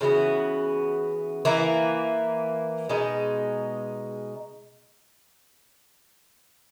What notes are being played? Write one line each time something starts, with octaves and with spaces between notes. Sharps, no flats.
C#3 E3 B3 F#4
E3 A#3 E4
B2 G#3 D#4